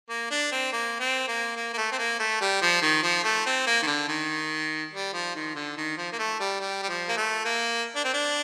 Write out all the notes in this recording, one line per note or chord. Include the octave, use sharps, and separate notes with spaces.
A#3
D4
C4
A#3
C4
A#3
A#3
A#3
A3
C4
A#3
A3
G3
F3
D#3
F3
A3
C4
A#3
D#3
D3
D#3
G3
F3
D#3
D3
D#3
F3
A#3
A3
G3
G3
G3
F3
A#3
A3
A#3
D4
C4
D4